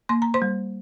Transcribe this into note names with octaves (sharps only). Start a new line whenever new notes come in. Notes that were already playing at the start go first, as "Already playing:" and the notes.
A#3 C6
A#5
C5 C6
G3